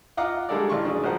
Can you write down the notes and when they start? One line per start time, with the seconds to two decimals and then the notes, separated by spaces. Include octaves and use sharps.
0.17 F4 D#5 F5 F#5 A#5 D6
0.49 G3 G#3 D4 A4 A#4 D5
0.69 A1 F5 C6 C#6
0.84 F#3 D4 G#4
1.04 A#1 A#4 C5 F#5